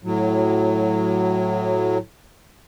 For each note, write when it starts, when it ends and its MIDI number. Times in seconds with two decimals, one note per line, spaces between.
0.04 1.98 45
0.04 1.98 54